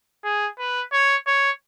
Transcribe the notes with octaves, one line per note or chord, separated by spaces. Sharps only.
G#4
B4
C#5
C#5